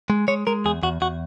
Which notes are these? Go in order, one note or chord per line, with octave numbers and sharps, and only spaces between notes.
G#3
G#3 C#5
G#3 A#4
E2 G#4
E2 F#4
E2 F#4